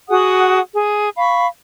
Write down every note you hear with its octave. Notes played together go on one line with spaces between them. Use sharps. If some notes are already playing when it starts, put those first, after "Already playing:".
F#4 G#4 F#5 D#6
G#4
F5 B5 C#6